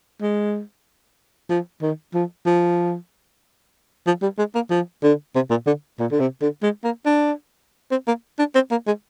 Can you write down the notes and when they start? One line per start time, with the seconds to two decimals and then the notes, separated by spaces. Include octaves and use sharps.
0.22 G#3
1.49 F3
1.82 D#3
2.14 F3
2.46 F3
4.07 F3
4.22 G3
4.38 G#3
4.55 A#3
4.70 F3
5.03 D3
5.35 C3
5.50 A#2
5.67 D3
6.00 A#2
6.12 D3
6.20 C3
6.42 D3
6.63 G#3
6.84 A#3
7.06 D4
7.91 C4
8.07 A#3
8.39 D4
8.55 C4
8.71 A#3
8.87 G#3